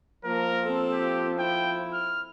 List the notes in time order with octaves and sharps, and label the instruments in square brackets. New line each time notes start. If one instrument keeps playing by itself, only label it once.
[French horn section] F3 [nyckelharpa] A#3 [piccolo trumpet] A#4
[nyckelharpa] C4 A4
[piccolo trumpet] G4
[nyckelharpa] E4 [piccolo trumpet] G5
[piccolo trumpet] F6